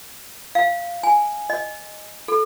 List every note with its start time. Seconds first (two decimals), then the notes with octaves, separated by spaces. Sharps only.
0.55 F5
1.03 G#5
1.50 D#5
2.28 A4